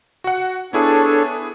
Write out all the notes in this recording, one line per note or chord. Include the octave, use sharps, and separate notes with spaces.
F#4 F#5
B3 D4 E4 G#4 A4 C#5